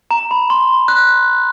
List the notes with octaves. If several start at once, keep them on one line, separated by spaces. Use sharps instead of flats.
A#5
B5
C6
F#6